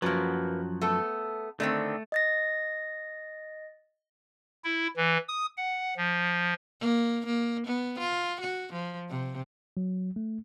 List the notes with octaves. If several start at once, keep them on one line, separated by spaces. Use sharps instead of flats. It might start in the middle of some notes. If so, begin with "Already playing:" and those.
F#2 F3 F#3 A#3 B4
A3 B3 A4
D3 D#3 A3 C4
D#5 A6 A#6
E4
E3
D#6
F#5
F3
A#3
A#3
B3
F4
F#4
F3
C3
F#3
A3